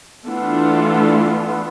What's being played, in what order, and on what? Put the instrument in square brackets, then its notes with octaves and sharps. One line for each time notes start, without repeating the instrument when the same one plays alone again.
[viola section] E3 A3 D4 F4 A4 [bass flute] B3